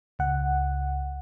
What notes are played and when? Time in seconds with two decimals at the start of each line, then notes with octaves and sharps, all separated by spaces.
0.19 C#2 F#5